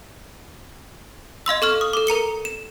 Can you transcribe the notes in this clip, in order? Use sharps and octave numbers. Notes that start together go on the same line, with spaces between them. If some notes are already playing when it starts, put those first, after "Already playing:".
D#5 F5 C6 E6
A4 C#6 F6
D#6
A4 D6
A#4 A#5 C#7 G7
E7